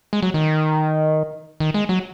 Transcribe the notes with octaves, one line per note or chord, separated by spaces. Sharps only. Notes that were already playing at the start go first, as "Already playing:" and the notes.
G#3
F#3
D#3
D#3
G#3
F#3